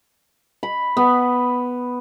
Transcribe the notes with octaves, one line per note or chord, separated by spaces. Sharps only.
B5
B3